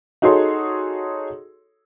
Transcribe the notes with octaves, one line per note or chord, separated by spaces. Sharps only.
D#4 F#4 G#4 A4 C#5 C6